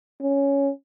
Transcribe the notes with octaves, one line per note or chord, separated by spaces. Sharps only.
C#4